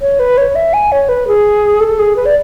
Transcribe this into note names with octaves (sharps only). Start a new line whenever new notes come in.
C#5
B4
C#5
E5
G#5
C#5
B4
G#4
A4
G#4
B4
D5